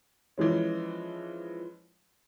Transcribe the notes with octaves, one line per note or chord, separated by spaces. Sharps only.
E3 F3 G#3 C#4